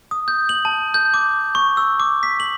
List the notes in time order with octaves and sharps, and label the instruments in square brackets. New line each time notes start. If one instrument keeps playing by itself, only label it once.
[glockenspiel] D#6
G6
F#7
A5
G6
D6
C#6
E6
D6
B6
F#7